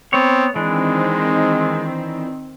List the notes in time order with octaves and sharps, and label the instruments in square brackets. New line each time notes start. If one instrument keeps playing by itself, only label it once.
[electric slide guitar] B3 C#5 [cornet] C4
[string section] D#3 C4 [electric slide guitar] E3 D4 [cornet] G#3